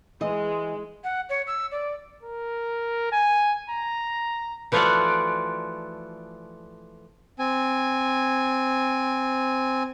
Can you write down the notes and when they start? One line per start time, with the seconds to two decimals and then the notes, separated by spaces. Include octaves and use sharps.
0.21 E3 G#3 D#5
1.04 F#5
1.29 C#5
1.47 E6
1.71 D5
2.23 A#4
3.12 G#5
3.70 A#5
4.72 E3 F3 A3 F4 F#4 D5
7.39 C4 G#5